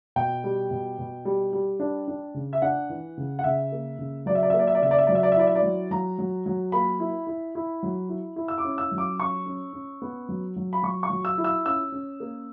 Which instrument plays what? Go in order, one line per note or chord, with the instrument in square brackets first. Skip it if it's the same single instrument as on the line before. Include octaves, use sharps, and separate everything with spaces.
[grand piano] B2 G5
G3
B2
B2
G3
G3
D4
D4
C#3
E5
D4 F#5
E3
C#3
F#5
C#3 E5
A#3
C#3
F#3 D5
E5
D5
E5
A#3
D5
E5
D5
C#3 E5
D5
E5
F#3 D5
E5
D5
E5
E4 D5
E5
D5
F#3
F#3 A#5
F#3
F#3
A#3 B5
E4
E4
E4
F#3
E4
E4
E6
D6
C#4
E6
F#3
D6
C#4 C#6
C#4
C#4
B3
F#3
F#3
B5
F#3 C#6
C#6
F#3
E6
E4
E6
C#4 E6
C#4
A#3